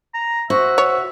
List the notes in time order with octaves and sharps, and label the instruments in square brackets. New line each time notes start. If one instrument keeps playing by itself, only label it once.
[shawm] A#5
[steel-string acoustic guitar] F#4 [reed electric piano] C5 [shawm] E5
[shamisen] C#5